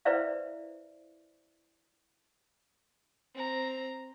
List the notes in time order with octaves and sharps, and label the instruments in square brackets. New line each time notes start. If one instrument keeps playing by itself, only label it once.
[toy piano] E4 B4 C5 D5 E5 F5
[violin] C4 A#5